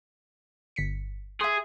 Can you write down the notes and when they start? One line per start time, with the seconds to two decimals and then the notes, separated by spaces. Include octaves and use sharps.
0.76 G1 B6 C#7
1.41 G#4 E5 C6